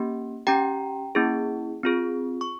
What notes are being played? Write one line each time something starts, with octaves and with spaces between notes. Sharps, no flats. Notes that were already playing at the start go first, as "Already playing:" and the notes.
Already playing: A#3 C#4 G4
C#4 G4 G5 A#5
A#3 C#4 E4 G#4
C4 F4 G#4
C#6